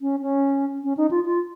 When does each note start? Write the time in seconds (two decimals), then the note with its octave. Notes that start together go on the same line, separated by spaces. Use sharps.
0.01 C#4
0.22 C#4
0.84 C#4
0.97 D#4
1.11 F4
1.25 F4